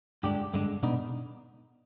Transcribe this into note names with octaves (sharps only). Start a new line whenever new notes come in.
G2 D3 G#3 D4 G4
G2 D3 G#3 D4
B2 B3 D4 D#4